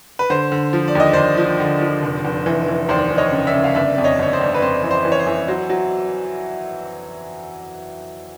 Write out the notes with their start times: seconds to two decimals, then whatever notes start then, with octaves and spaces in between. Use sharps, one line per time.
0.19 B4
0.30 D3 C5
0.52 D3
0.73 F3
0.88 D5
0.95 D#2 D#5
1.13 D#2 C5 D5
1.38 F3
1.60 D3
1.82 F3
2.03 F1
2.25 F1
2.46 E3
2.68 E3
2.89 D#2 C5 D5
3.10 E3
3.18 C#5 D#5
3.32 C#3
3.47 D5 E5
3.54 C#3
3.64 F5
3.75 G1 D5 E5
3.95 F2 D5
4.04 C#5 D#5
4.19 G1 C#5
4.33 C5 D5
4.41 G1
4.54 B4
4.62 F2 C5
4.83 E3
4.91 C5
5.05 E3
5.12 C#5
5.20 C5
5.26 E3
5.48 F#3 C5
5.70 F#3